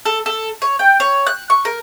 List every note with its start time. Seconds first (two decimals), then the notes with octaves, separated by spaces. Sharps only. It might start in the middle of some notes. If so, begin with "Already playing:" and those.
0.05 A4
0.26 A4
0.62 C#5
0.79 G5
1.00 C#5
1.27 F#6
1.50 C#6
1.65 A#4